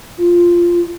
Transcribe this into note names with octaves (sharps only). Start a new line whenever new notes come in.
F4